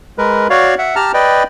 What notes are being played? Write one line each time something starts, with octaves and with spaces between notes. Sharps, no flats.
G#3 A#4 B4
F#4 C#5 D5 F5
E5 F#5
G4 A5 A#5 F6
B4 D5 D#5 G5